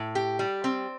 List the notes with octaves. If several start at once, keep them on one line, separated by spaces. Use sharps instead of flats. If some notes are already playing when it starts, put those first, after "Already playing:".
Already playing: A2
G4
G3
C4